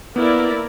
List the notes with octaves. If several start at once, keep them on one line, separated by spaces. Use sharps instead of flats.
A#3 B3 E4 A#4 D5